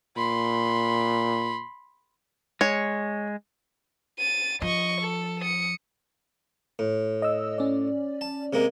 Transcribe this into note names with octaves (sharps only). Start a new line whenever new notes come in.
A#2 B5 C6
G#3 C#5
A6 D#7
F3 D#5 C#6
A4
D#6 C#7
A2
D#5 E6
C#4 D5
A5
C3 G#3 A#3